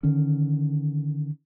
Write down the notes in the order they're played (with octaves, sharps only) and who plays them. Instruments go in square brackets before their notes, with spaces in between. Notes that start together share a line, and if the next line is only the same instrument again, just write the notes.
[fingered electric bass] D3 D#3 C#4